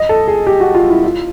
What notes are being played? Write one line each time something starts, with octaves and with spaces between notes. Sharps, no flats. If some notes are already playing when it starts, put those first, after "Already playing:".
Already playing: D#5
A4
G#4
G4
F#4
F4
E4
F4